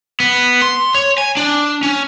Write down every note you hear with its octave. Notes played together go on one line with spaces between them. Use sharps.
B3
C6
C#5
G#5
D4
C#4